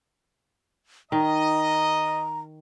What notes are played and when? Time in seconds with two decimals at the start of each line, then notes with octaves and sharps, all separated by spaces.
1.12 D#3 D#5 A#5